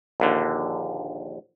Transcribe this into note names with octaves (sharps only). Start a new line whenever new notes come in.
A#1 D#2 D3